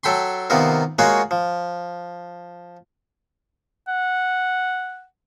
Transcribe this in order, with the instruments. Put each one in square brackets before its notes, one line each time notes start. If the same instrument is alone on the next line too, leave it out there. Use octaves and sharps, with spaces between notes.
[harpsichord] F#3 A4 G5 B5 C6
C3 D#3 B3 F4 A#4
G#3 A#3 F4 F#4 C#5 F#5
F3
[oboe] F#5